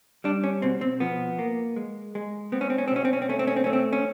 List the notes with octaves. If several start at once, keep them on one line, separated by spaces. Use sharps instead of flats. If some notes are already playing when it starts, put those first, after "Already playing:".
G3 D4
C#4
B2 C4
C4
F3 B3
A#3
G#3
G#3
B3 C4
C#4
C4
C#4
C4
B2 C#4
C4
C#4
C4
A3 C#4
C4
C#4
C4
A3 C#4
C4
C#4